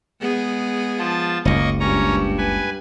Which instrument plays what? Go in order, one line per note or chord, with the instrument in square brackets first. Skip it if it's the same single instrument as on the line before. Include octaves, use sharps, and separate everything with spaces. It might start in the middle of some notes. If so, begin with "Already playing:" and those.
[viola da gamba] G#3 B3 G#4
[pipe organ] F3 F4 A5
[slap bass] F#1 C#2 F#2 [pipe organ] A#3 D#5 C#6
[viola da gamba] G2 [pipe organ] C#4 C#5 A#5
[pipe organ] B4 G#5